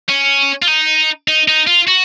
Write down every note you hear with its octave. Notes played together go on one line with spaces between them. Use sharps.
C#4
F4
D#4
D#4
D#4
F4
F#4